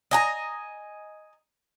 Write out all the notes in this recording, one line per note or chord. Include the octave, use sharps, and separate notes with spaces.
D#5 G#5 A#5